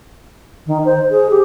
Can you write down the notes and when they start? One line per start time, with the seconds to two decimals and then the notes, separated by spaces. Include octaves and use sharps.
0.66 D#3
0.85 C5
1.10 G#4
1.30 G4